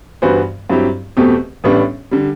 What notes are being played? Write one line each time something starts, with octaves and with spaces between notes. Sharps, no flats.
G2 E3 B3 F#4 C5
G2 F#3 C4 E4 G4
E2 B2 A3 C4 G4
A1 A2 G3 B3 D4
D3 G3